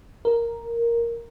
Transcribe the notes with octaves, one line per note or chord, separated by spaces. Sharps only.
A#4